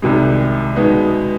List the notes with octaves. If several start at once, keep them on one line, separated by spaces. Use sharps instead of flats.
C2 C3 D#3 G#3
B2 G#3 B3 D#4